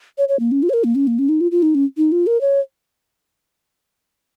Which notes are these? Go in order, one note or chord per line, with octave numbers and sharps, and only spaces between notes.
C#5
C#5
A#3
C#4
F4
C#5
A#4
A#3
C#4
A#3
C#4
D#4
F4
F4
D#4
C#4
D#4
F4
A#4
C#5